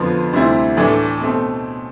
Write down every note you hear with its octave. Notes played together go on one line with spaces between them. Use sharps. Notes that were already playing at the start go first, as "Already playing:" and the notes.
Already playing: F2 D3 F3 B3
D2 C3 G3 C4 E4
A2 E3 A3 D4
B2 A3 C4